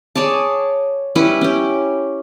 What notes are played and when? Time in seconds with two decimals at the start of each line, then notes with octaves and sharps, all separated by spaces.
0.16 G#4 C#5 D5 A5
1.15 G3 C#4 E4 B4
1.41 C#4 G4